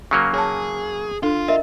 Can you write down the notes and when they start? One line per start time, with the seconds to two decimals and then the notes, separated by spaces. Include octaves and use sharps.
0.11 C#3 F#3 A#3
0.34 G#4 C#5 A5
1.23 D4 F4 A4
1.48 A#4 D#5 E5